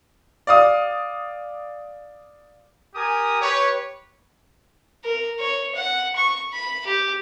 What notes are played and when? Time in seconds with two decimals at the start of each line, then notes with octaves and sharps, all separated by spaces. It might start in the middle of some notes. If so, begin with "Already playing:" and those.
0.47 D5 F5 D#6
2.94 G4 A#4 G#5 D#6
3.40 G4 B4 C#5
5.04 A#4
5.40 C#5
5.75 F#5
6.16 C#6
6.53 B5
6.86 G4